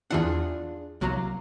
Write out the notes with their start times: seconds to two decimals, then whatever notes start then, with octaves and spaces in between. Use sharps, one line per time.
0.10 E2 E3 D4 F4 G#4 F#5
1.01 C2 F#3 A#3 A#5